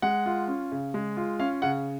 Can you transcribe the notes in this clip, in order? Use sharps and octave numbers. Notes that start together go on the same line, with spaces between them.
G#3 F#5
F4
C#4
C#3
G#3
F4
C#4 F5
C#3 F#5